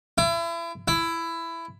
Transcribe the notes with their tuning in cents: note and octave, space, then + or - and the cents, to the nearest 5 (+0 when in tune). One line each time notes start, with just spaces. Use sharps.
E4 +35
E4 +15